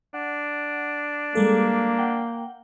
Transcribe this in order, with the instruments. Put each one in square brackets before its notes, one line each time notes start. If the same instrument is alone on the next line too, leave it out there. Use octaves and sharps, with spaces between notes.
[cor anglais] D4 [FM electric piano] F#5
[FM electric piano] G3 G#3 A4 [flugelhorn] A#3
[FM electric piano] F#5 G5